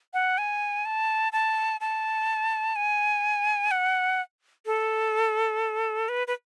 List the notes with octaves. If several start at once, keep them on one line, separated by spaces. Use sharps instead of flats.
F#5
G#5
A5
A5
A5
G#5
F#5
A4
B4
B4